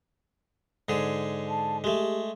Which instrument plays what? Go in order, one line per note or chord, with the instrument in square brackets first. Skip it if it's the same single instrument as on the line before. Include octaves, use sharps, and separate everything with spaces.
[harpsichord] G#2 D3 G#4
[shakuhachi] A5
[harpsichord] G#3 A3 [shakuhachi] G4